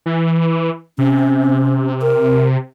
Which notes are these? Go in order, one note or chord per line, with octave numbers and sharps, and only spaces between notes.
E3
C3 C#4
A#4